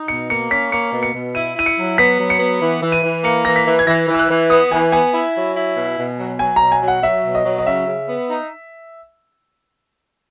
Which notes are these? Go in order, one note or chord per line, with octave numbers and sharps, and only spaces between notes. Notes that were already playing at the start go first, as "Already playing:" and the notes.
Already playing: D#4
B2 C#7
A#3 C#7
C#4 B6
A#3 C#7
B2
C#7
B2
E4 D#7
E4 D#7
C#7
F#3
B3 B6
F#3
C#7
B3
E3
E3
D#7
E3
A#3 C#7
E3 A#6
B6
E3
G#6
E3 A#6
E3
E6
F#6
E3
B3 D#6
E3 G#5
B3 G#5
E4
F#3
E4
B2
B2
F#3
F#3 G#5
B2 A#5
G#5
F#3
F#5
F#3 E5
B2
D#5
F#3
D#5
C#3 E5
C#3
B3
D#4